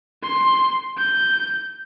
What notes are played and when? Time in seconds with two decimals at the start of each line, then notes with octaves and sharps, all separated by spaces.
0.23 C6
0.97 G6